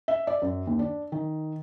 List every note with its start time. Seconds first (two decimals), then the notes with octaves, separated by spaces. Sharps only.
0.08 E5
0.27 D5
0.42 F#2
0.67 D#2
0.79 D4
1.12 D#3